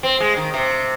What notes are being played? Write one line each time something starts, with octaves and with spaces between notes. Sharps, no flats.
C4
G#3
D#3
C3